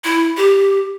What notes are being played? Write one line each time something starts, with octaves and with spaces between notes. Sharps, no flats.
E4
G4